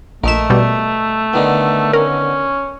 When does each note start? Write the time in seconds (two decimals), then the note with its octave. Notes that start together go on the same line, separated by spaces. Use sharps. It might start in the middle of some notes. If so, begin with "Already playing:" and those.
0.24 A#1 A3 A#4 D#5 E5 E7
0.50 B2 G3
1.33 D3 D#3 B3
1.93 C#4 A#4